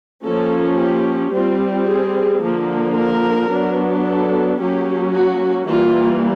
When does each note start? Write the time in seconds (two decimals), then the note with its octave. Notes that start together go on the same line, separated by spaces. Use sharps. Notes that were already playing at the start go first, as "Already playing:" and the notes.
0.25 F3 A#3 C#4 A4
0.79 G4
1.34 G3 C4 F4
1.88 G#4
2.41 D3 F3 A#3
2.96 A#4
3.51 F#3 B3 D4
4.05 A4
4.60 F#3 A#3 C#4 G4
5.14 F#4
5.68 E3 G3 A#3 F4